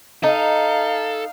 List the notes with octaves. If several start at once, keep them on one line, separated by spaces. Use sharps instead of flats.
D#4 A4 F5